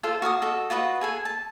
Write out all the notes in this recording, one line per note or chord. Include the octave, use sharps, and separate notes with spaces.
F4 A4 C5 F5
F#4 F5 A5 D#6
F#4 A4 D#5
F4 F#4 B4 D#5
G#4 A4 G#5
A5